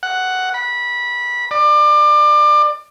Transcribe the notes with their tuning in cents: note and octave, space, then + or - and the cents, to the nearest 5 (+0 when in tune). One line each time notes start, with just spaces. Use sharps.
F#5 +5
B5 -20
D5 +30